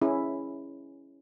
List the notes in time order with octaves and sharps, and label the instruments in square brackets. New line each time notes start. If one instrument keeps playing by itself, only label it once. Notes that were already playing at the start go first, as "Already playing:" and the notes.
[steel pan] C#4 E4 G#4